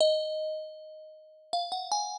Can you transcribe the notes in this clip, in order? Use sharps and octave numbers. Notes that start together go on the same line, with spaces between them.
D#5
F5
F#5
G#5